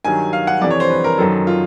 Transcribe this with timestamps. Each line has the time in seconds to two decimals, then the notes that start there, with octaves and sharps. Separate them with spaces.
0.04 G2 D#3 F#3 G#5
0.33 F5
0.47 F#5
0.61 F2 C3 E3 D5
0.70 C#5
0.80 C5
0.90 B4
1.04 A#4
1.18 F#2 D#3 F#3 A4
1.47 F4